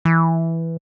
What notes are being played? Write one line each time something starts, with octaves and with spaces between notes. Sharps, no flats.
E3